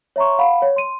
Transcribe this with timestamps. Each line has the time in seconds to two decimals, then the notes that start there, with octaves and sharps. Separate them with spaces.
0.16 C#5 E5 A#5 C6 C#6
0.39 F5 F#5 B5
0.62 C#5
0.76 C6 D#7